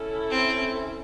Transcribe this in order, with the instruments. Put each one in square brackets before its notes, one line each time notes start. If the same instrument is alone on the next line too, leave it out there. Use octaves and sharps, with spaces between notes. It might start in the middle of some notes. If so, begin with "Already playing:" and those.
Already playing: [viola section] C#4 E4 A4
[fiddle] C4